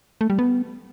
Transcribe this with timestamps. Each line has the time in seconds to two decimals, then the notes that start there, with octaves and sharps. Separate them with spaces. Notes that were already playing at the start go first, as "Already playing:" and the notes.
0.21 A3
0.30 G3
0.39 B3